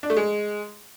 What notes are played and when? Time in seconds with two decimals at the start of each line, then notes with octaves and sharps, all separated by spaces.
0.03 D4
0.10 A3
0.16 G#3